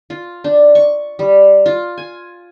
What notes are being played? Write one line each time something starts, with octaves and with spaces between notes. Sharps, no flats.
F4
D4
C#6
G3
F4
G#5